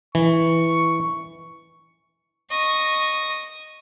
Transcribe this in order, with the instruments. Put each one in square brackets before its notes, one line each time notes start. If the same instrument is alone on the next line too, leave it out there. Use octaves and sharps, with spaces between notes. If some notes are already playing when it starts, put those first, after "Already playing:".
[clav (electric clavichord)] E3 [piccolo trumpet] C#6
[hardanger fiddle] D#5 C#6